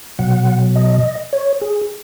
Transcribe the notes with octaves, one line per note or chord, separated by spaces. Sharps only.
B2 F#3 F#5
D#5
C#5
G#4